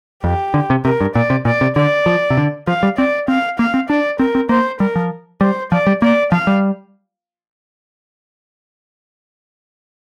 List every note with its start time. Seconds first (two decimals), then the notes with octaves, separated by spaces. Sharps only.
0.24 F2 G4
0.54 D3
0.70 C3
0.85 C3 A#4
1.01 G2
1.15 A#2 D5
1.30 C3
1.45 A#2 D5
1.61 C3
1.76 D3 D5
2.06 F3
2.30 C3
2.37 D3
2.67 F3 F5
2.83 G3
2.98 C4 D5
3.28 C4 F5
3.59 A#3 F5
3.74 C4
3.89 D4 D5
4.19 C4 A#4
4.35 C4
4.49 A#3 C5
4.80 G3 A#4
4.96 F3
5.41 G3 C5
5.71 F3 D5
5.87 G3
6.02 A#3 D5
6.32 F3 F5
6.47 G3